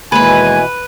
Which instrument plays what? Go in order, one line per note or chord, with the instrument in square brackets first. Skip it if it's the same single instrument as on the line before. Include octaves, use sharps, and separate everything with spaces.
[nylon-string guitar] D#2 G#3 [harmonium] B2 E3 [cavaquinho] B4 B5 [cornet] G#5